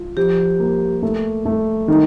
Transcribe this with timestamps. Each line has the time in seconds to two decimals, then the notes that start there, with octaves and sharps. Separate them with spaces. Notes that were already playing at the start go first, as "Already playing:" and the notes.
Already playing: F4
0.17 F3 G4
0.60 A#3
1.02 A3
1.45 A3
1.88 D#3